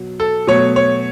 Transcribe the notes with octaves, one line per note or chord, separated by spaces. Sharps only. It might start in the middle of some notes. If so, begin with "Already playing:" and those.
Already playing: B2 F#3
A4
B2 F#3 A3 C#5
C#5